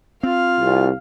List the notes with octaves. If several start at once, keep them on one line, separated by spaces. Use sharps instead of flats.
C4 F4 F5
C2